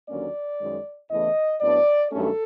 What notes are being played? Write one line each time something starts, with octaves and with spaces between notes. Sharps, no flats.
D#2 D3 F#3 A#3 C#4 D5
F#2 D#3 G#3
E2 C#3 E3 A3 D#5
A2 F#3 B3 D4 D5
G2 D#3 F#3 A3 C#4 A4